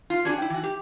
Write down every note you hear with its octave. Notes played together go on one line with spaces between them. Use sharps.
F4
C#4 D4 F#4 G#4
E4 G5
E3 F#4
G4